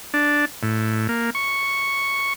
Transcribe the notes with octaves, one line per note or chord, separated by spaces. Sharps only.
D4
A2
A#3
C#6